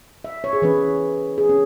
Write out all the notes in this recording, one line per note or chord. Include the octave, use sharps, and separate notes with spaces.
E5
C#5
G#4
E3 C#4 B4
G#4
C#4